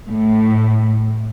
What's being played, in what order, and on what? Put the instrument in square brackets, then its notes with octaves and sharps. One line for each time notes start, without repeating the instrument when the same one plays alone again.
[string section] A2